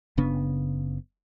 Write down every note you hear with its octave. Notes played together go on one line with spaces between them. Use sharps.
F#1 C#3 B3 D4